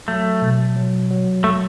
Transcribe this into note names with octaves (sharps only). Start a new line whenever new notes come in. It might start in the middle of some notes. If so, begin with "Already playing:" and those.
F#3 A3
B2
F#3
F#3
A3